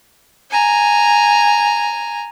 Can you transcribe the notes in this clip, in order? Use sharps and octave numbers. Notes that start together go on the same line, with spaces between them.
G#5 A#5